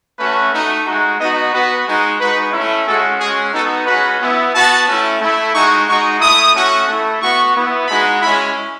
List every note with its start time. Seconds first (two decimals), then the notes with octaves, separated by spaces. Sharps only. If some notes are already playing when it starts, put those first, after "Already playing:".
0.18 A3 C#4 F#4 B4
0.52 A3 D#4 F#4
0.86 G#3 D#4 F#4
1.19 B3 D#4 F#4 D#5
1.52 B3 F#4 B4
1.85 G#3 D#4 F#4
2.19 G#3 D#4 F#4 B4
2.53 A3 C#4 E4
2.85 G#3 C#4 F#4 A4
3.19 G#3 C#4 F#4 G#4
3.52 B3 D#4 F#4 A4
3.86 G#3 C#4 F#4 B4
4.20 B3 E4
4.53 B3 F#4 A5
4.87 A3 C#4 E4
5.20 A3 E4
5.53 G#3 D#4 F#4 C#6
5.87 G#3 D#4 F#4 C#6
6.20 A3 E4 D#6
6.54 A3 C#4 F#4
6.87 A3 E4
7.21 B3 F#4 C#6
7.55 B3 E4
7.88 G#3 D#4 F#4 B5
8.21 G#3 C#4 E4 B5